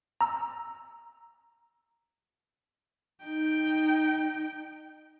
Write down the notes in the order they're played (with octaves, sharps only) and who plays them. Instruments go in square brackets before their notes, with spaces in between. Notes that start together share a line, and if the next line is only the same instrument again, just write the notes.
[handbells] A#5 E6
[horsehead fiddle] D#4 G5